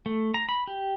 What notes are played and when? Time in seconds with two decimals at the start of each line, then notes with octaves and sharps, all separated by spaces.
0.06 A3
0.34 A#5
0.49 B5
0.67 G4